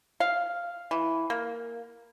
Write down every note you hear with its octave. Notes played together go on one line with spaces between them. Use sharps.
F5
E3
A#3